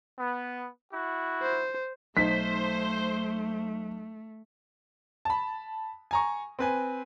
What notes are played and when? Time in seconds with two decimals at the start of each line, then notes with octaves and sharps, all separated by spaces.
0.19 B3
0.92 E4 F#4
1.42 C5
2.17 B1 A3 D#4 C5 B6
5.25 A5 B5
6.11 G#5 A#5 C#6
6.59 C4 B4 G#5